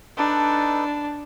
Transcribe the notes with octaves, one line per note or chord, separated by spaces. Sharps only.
D4 D#4 A4 B4